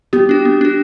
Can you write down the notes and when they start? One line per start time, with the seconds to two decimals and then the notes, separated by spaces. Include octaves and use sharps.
0.13 B3 G4
0.29 D4 F#4
0.45 B3
0.61 D4 F#4